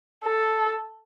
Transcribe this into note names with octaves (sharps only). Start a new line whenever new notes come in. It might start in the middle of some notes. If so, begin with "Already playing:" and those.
A4